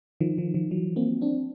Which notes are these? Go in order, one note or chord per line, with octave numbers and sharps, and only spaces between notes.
D#3 F3
D#3 F3
D#3 F3
E3 F#3
A#3 C4
C4 D4